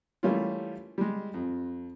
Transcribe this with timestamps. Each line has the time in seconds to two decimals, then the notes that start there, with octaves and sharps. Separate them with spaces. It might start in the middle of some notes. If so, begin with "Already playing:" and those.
0.23 E3 G3 A3 A#3 C#4 F4
0.98 G3 G#3
1.34 F2